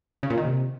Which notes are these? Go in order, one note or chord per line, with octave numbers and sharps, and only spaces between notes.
C#3
A#2
D#3
C3